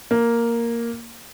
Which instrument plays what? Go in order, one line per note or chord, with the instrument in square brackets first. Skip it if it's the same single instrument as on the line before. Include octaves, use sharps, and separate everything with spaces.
[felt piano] A#3